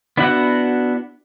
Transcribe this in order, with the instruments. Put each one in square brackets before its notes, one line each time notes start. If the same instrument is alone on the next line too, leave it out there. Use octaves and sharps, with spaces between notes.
[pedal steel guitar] B3 D4 E4 F#4 F#5